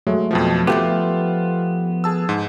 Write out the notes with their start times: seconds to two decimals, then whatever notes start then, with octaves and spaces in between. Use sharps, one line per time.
0.07 F#3 G#3 A3
0.31 F2 B2 F3
0.67 F3 A3 B3 F4 G4
2.04 G#4 A5 E6
2.29 G#2